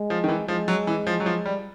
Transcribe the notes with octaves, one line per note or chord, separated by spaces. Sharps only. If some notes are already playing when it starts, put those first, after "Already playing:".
Already playing: G#3
F3
D#3
E3
F3 G#3
F#3
E3
F3
F#3
F3
G3